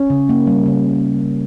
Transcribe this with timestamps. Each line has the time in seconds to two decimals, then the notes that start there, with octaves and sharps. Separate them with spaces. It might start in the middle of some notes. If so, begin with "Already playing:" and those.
Already playing: C#4
0.10 C#3
0.29 A#3
0.47 G3
0.66 C#3